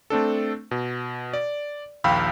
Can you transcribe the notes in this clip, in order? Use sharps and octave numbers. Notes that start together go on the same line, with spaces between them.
A3 C4 D4 A4
B2
D5
A#1 D#2 F5 G5 B5 E6